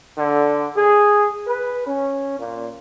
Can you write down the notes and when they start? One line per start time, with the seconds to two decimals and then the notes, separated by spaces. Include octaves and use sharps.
0.18 D3
0.76 G#4
1.46 B4
1.87 C#4
2.39 A#2